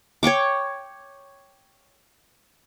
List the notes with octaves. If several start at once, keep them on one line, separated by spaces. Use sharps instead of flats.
C#5 G5 C#6 D6